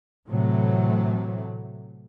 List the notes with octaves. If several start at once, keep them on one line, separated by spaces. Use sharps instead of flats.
A2 C3 E3 F#3 A3